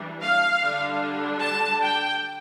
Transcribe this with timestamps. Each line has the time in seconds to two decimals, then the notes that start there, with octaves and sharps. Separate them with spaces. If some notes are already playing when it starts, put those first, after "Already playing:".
Already playing: E3 G3 D4
0.23 F5
0.63 D3 G3 D4
1.41 A5
1.81 G5